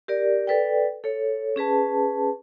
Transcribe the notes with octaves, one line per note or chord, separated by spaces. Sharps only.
G4 A#4 D5
A4 B4 D5 G5
A4 C#5
C#4 G#4 B4 A5